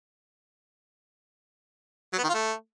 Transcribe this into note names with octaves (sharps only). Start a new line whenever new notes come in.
F#3
B3
D#3
F4
A3